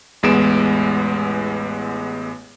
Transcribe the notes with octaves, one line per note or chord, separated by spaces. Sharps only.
A1 E2 G#3 B3 D7 E7